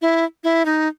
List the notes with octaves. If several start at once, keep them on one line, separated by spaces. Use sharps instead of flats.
E4
E4
D#4